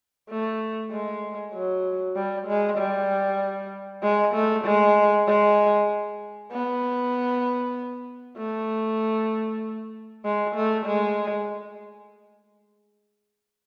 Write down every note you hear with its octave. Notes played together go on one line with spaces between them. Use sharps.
A3
G#3
F#3
G3
G#3
G3
G#3
A3
G#3
G#3
B3
A3
G#3
A3
G#3